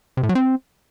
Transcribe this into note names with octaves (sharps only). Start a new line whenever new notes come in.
C3
A2
F#3
C4